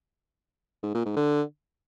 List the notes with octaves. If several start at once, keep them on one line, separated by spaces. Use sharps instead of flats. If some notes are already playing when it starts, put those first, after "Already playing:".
G#2
A#2
G#2
D3